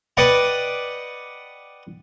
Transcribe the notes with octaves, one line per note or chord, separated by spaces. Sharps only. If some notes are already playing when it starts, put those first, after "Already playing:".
B4 D5 D#5 F#5 G5 B5